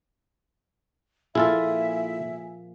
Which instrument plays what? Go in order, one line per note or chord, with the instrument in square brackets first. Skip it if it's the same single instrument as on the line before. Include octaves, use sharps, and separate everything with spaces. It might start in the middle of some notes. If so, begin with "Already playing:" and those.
[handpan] A#2 F3 A#3 [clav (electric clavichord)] E4 F4 A4 [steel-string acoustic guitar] G#4 [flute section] E5